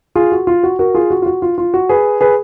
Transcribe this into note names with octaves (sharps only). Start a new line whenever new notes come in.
F4 G#4
F#4
F4
F#4
F#4 A#4
F4 G#4
F#4
F4
F#4
F4
F4
F#4
G#4 B4
G#4 B4